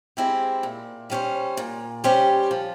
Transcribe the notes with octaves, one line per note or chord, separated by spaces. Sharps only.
G#3 C4 E4 G4
A#2
G3 C#4 G4 C5
A#2
G3 C#4 G4 C5
F3